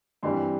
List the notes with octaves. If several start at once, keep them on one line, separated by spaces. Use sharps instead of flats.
G2 E3 G3 C4 C6